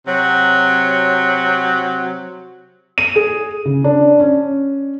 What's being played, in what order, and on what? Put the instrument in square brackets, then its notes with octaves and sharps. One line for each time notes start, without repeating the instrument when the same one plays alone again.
[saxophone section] C3 F#3
[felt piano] D#7
G#4
C#3
D4
C#4